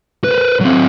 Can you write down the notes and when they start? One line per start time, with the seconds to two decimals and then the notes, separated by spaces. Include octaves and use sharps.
0.24 B4 C5
0.61 F#3 C4